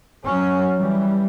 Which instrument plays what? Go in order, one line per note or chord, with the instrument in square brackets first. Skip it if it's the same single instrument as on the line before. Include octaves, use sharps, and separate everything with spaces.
[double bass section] F#3 C#4
E3 G3